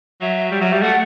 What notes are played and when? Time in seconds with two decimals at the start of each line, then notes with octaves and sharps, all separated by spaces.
0.21 F#3 E5
0.52 G3
0.61 F#3
0.72 G3
0.82 A3 F#5